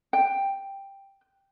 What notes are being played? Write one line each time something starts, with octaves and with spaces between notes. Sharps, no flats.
G5